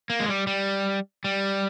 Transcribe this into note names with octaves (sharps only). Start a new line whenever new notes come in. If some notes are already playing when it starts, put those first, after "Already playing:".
A#3
G#3
G3
G3
G3